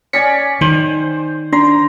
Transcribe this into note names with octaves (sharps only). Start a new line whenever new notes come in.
C#4 D5 G#5 B6 C#7
D#3 C5
D4 A#5 C6